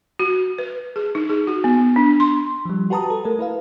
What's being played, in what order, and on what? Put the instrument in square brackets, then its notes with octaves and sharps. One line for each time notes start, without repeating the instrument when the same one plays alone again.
[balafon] F#4
B4
G#4
D#4
G#4
F#4
B3
D4
C6
[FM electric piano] F3 G3
F#4 G4 B4 A5 A#5 D#6
A4
A3 A#4
E4 B4 F5